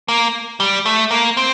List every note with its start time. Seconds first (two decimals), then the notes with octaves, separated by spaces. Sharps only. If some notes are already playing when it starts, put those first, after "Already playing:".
0.08 A#3
0.60 G3
0.86 A3
1.11 A#3
1.37 C4